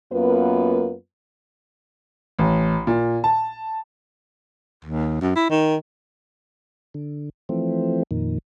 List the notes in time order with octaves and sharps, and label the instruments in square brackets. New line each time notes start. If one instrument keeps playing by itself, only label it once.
[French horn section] F#2 A#3 B3 F4 B4
[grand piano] A1
A#2
A5
[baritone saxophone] D#2
F#2
E4
D#3
[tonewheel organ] D3
E3 F3 A3 C4
F2 A#2 D#3